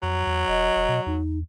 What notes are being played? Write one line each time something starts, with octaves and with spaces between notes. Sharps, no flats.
F2 F#3
E2
E1 D#5
E1
B2
E2 D#4